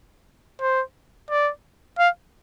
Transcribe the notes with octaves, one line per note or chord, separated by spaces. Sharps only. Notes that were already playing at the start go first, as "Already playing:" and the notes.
C5
D5
F5